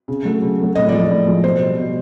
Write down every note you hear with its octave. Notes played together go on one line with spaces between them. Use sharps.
C#3
F#3 A3
C#3
F#3 A3
A2 D#5
F3 G#3 D5
D#5
A2
F3 G#3
B2 C5
G3
B2